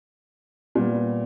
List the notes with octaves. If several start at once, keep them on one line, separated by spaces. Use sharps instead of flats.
A#2 G3 B3 D5